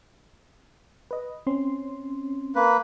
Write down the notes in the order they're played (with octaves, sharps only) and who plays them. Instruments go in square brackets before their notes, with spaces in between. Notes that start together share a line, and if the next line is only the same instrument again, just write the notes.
[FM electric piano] B4 D#5
C4 C#4 C6
[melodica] A#3 B4